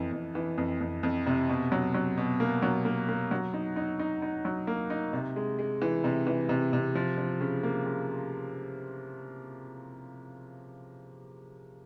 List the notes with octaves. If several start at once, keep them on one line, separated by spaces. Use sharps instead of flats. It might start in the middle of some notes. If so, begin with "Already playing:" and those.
Already playing: F2 E3
F2
E3
F2
F2
F2
C3
B2
F#3
F#3
B2
A#3
F#3
A#3
A#3
F#3
D#4
D#4
D#4
D#4
F#3
A#3
D#4
C3
G#3
G#3
E3
C3
E3
C3
C3
F3
F3
C#3
A#3
C#3